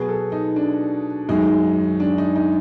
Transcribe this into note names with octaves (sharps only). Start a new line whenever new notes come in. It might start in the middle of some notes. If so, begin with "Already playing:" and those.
Already playing: B2 F#3 B3 G#4
A4
D#4
D4
F#2 D#3 G#3 D#4
D4
D#4
D#4